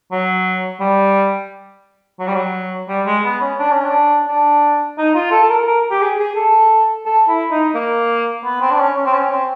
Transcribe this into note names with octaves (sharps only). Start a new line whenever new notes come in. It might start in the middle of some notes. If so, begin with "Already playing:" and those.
F#3
G3
F#3
G3
F#3
G3
G#3
B3
C#4
D4
C#4
D4
D4
D#4
F4
A4
A4
A#4
A#4
G4
G#4
G#4
A4
A4
E4
D#4
A#3
B3
C4
D4
C#4
C#4
C4
C#4
C4